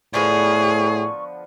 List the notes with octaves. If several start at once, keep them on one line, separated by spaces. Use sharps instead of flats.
A2 D3 F3 B3 G#4 C#6